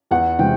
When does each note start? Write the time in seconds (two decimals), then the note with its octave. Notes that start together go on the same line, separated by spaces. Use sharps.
0.11 E2 F#5
0.39 C3 E3 G#3 G5